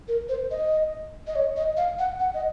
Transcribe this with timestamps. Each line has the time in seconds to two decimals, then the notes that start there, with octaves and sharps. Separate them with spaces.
0.08 A#4
0.29 C5
0.51 D#5
1.27 D#5
1.36 C#5
1.57 D#5
1.77 F5
1.99 F#5
2.20 F#5
2.34 D#5